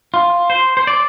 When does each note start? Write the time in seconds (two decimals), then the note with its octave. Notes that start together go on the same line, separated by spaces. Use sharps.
0.14 F4
0.50 C5
0.77 C5
0.87 D5